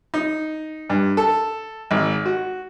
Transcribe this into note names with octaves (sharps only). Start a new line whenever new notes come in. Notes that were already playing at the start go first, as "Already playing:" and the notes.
D#4
G2
A4
G#1
F#4